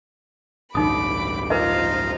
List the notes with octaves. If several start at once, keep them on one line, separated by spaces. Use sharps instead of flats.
A1 D2 G2 D#4 B5 D6 D#6
F3 D#4 F4 A#4 D#5 F5 A#5